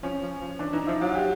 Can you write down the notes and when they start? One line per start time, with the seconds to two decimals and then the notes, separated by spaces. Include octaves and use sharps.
0.03 F3 C#4
0.22 F3
0.41 F3
0.59 E3 D4
0.73 E3 D#4
0.87 F3 E4
1.01 F#3 F4
1.15 G4